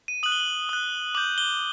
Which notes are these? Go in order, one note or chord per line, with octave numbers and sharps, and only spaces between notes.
D#7
D#6 F#6 F#7
G7
F#7
D#6 F#6
D6 G6 F#7
G7